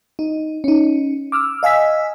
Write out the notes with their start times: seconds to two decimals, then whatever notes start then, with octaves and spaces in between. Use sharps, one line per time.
0.19 D#4
0.64 C#4 D#4
1.32 D6 E6 F6
1.63 D#5 F5 G#5 E6 B6